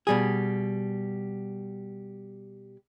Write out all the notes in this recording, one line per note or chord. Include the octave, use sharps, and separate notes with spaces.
B2 G3 G#4